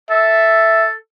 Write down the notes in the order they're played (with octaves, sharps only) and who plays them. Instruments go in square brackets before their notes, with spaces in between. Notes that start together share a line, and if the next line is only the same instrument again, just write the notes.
[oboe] A4 [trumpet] E5